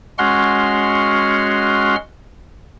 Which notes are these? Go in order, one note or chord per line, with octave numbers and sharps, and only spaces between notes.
G#3 C#4 F#4 F#5 C6 F6